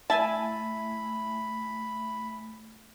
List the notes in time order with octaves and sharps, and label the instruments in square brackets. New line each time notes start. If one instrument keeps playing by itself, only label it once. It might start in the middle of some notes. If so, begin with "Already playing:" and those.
[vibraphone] A3 [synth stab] E4 E5 G#5 [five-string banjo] A5 [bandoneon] B5